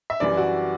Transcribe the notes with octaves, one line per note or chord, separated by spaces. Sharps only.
E5
F#2 E3 G3 D5
F#4